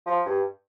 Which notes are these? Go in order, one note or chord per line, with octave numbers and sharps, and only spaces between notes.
F3
G2